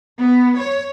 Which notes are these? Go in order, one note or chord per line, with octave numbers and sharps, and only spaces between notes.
B3
C#5